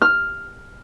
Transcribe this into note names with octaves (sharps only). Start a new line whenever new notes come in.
F6